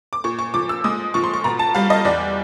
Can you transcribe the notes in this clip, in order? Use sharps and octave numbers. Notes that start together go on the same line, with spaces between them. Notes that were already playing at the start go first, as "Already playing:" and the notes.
D6
A#2 C#6
C#6
F3 D6
E6
G#3 D#6
F3 C#6
C6
C#6
B2 A#5
A5
G3 F5
D#5
E2 D5